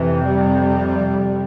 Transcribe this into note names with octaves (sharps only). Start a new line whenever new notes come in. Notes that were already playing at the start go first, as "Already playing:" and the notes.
Already playing: F2 C3 E3
G3